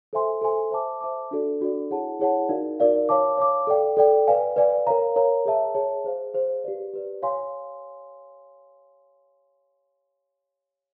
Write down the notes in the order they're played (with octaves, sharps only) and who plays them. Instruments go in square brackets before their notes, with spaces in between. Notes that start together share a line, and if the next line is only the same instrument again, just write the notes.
[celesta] A4 C5 E5 G#5 C6
A4 C5 E5 G#5 C6
C5 E5 A5 D6
C5 E5 A5 D6
D4 F#4 A4 D5
D4 F#4 A4 D5
E4 G#4 C#5 F#5 A5
E4 G#4 C#5 F#5 A5
D#4 F#4 A#4 D5 F5
D#4 F#4 A#4 D5 F5
C#5 F5 A5 D6
C#5 F5 A5 D6
A4 D5 G5
A4 D5 G5
B4 D5 F5 G#5
B4 D5 F5 G#5
A#4 C#5 F5 A#5
A#4 C#5 F5 A#5
G#4 C#5 E5 A5
G#4 C#5 E5 A5
G#4 C5 F5
G#4 C5 F5
G4 B4 D5
G4 B4 D5
C#5 F5 G#5 C6